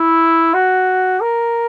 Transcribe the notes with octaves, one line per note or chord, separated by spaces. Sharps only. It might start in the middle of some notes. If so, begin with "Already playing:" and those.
Already playing: E4
F#4
A#4